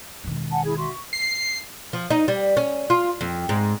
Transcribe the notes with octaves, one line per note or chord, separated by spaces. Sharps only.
E1 D#3
F#5 G#5 A5
E4 G#4 G#6
F#4 E5 C6
C#6
C7
F3
D#4
G3
C#4
F4
F2
G#2